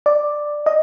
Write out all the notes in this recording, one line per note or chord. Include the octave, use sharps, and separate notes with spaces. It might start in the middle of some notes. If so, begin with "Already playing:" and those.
D5
D#5